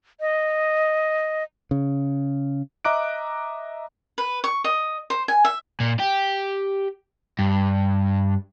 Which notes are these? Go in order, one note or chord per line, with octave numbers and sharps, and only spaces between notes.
D#5
C#3
D#5 E5 A#5 D6 F#6 D7
B4
C#6
D#5
C5
G#5
E5
A#2
G4
G2